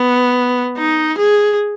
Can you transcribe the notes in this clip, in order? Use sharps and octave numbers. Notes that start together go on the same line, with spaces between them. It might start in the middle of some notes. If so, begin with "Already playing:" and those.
Already playing: B3
D#4
G#4